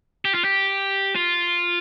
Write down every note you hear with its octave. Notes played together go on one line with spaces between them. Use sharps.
G4
F4
G4
F4